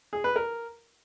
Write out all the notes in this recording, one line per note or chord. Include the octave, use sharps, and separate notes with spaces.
G#4
B4
A#4